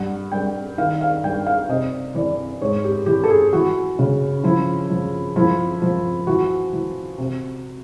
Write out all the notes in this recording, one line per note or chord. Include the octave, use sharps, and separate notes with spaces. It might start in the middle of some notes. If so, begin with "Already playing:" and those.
Already playing: G2 F#5
G2 G5
D#3 F5
F5
G2 G5
F5
C3 D#5
E3 D5
G#2 C#5
G4
E3 G4
A4
G#4
E3 F#4
C#3
F3 E4
F3
F3 E4
F3
E3 F#4
E3
C3